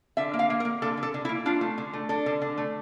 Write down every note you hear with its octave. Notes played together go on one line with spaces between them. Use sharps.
D3 E5
A#3
F5
A#3
A#4
A#3
D3 A4
D3
A4
D3
E4
A#3
D4 F4
A3
D3
A3
D4 A4
D3
D3
A3